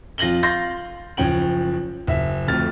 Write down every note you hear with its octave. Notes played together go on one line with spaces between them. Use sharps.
F2 F4 A#6 F#7 G7
F5 C6 G6 A6 A#6
F#1 F3 C#4 G5 F#7
F#1 E5
D1 F2 A2 F6 A6